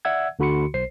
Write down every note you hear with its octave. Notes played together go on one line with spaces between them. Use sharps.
D5 E5 F#5 E6 G#6
D2 D3 F#4 B5 C6 C#7
B1 C5 C7